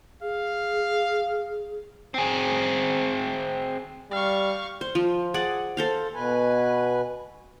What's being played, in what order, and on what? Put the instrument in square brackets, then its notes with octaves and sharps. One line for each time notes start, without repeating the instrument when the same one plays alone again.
[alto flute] G#4 [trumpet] F5
[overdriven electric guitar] C4 G#4
[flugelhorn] G3 [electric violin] F5 C#6
[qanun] C5
F3
G#4 D5 F#5
A4 C5 F5
[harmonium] B2 B4 G#5